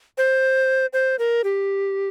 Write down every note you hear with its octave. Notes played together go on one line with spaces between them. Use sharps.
C5
C5
A#4
G4